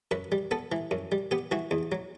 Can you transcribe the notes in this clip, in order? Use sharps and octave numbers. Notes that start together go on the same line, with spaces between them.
F#2 B4
G3
B3 A4
E3
F#2
G3
B3 G4
E3 F#4
E2
F#3